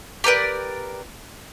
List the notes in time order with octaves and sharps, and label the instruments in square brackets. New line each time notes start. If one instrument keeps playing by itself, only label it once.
[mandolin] G4 A#4 B4 D5